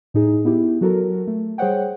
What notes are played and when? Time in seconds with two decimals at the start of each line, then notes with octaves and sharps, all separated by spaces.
0.14 A2 D#4 G#4
0.45 B3 E4 G4
0.81 F#3 F#4 A4 A#4
1.27 A3
1.58 G3 G#4 C5 C#5 F#5 G5